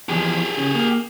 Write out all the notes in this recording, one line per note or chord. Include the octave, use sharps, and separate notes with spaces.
E2 E3 F3 G4 G#4
C#3
A#3